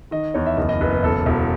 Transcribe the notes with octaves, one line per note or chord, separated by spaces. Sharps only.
D#3 D#5
E2 C#5
E5
F#1 D#5
D#5
F#1 B4
B4
E1 A4
E1